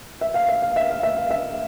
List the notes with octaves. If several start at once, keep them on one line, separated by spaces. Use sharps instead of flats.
E5
F5
E5
F5
E5
F5
E5
F5
E5